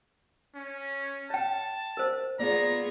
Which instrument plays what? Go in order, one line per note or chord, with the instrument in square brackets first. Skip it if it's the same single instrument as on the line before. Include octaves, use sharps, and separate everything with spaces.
[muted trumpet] C#4
[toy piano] C#5 G5 [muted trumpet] A5
[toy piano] A#4 C5
[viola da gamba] B3 F4 G#4 [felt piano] D5 [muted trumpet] A#5